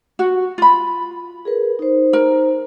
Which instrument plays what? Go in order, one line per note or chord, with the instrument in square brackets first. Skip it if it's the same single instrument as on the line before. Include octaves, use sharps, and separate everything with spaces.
[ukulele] F#4
F4 B5
[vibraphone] G#4 A#4 B4
D#4 C5
[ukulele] A#4